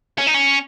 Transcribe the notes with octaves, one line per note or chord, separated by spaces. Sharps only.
C#4
D#4
C#4